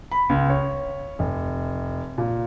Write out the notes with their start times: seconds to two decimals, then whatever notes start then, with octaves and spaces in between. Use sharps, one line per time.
0.12 B5
0.29 C#2
0.49 C#5
1.19 F1
2.18 A#2